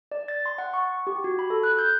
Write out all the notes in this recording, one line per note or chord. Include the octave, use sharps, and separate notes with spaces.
D5
A6
C6
F#5
C#6
G4
F#4
B5
A4
F#6
G6